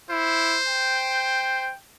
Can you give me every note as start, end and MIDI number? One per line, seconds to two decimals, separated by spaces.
0.11 0.59 64
0.11 1.70 72
0.68 1.77 79